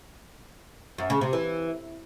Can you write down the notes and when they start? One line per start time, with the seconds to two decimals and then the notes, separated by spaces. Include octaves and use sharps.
0.98 F#2
1.10 C#3
1.21 C3
1.33 E3